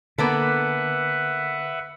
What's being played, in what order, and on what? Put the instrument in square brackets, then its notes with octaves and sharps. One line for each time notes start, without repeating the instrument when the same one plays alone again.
[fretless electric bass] D3 [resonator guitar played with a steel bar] A#3 B3 A4 [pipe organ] B4 E5 F#5